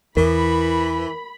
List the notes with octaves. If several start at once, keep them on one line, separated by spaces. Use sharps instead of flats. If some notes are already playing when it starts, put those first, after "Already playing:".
E2 E3 A#4 B5